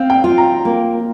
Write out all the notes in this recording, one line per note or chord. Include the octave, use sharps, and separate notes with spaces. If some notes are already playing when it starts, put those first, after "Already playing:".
Already playing: C4 F5
G5
F4
A#5
A#3